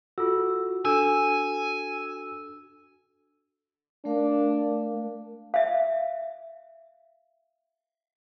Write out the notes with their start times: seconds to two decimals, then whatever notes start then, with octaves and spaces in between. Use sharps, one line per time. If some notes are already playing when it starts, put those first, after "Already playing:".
0.18 F4 F#4 A4 E6
0.85 D4 A4 G#5 E6
4.05 A3 D4 A#4 F5
5.54 E5 F5